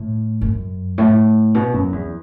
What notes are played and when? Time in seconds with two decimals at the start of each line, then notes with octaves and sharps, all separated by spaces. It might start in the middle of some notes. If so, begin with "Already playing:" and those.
Already playing: A2
0.41 F#2
0.98 A2
1.54 B2
1.74 F#2
1.92 E2